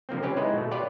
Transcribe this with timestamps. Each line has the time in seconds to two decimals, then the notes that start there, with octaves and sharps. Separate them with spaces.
0.09 D3 F3 A#3 C4
0.23 C4 C#4 G4 B4
0.37 G#3 B3 D#4 E4 B4 C5
0.54 B2 A3
0.71 F4 G4 B4 C#5 D5